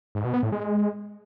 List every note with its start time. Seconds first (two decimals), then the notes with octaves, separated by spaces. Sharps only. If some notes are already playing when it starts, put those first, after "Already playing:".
0.15 G#2
0.24 B2
0.34 B3
0.43 A2
0.52 G#3